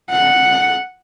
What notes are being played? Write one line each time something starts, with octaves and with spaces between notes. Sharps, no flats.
F#5